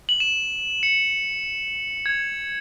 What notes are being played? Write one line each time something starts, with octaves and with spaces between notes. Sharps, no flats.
F#7
E7
C#7
G#6